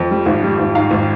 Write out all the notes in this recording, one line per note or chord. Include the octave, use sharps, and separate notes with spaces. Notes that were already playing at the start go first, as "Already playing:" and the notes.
Already playing: F2
G3
G#1
G3
G#1
G#2 F5
G#1